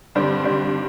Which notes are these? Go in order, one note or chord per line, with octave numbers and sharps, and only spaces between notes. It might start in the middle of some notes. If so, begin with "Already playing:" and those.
G2 D3 G3 C4
G2 D3 G3 C4